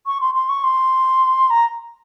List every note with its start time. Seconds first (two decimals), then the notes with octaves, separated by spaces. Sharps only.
0.07 C#6
0.21 C6
0.35 C6
0.49 C#6
0.64 C6
1.50 A#5